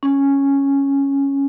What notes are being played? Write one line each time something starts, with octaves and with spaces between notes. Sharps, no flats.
C#4